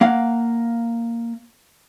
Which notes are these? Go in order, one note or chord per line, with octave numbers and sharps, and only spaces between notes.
A#3 F5 F#5